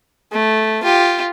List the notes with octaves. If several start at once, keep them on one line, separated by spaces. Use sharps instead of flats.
A3
F4 G4